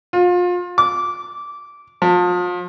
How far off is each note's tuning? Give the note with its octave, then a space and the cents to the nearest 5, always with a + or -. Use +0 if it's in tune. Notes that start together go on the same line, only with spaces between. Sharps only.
F4 +30
D6 -15
F3 +35